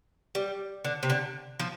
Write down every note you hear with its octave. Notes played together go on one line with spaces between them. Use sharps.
G3
D3
C3
D3
F3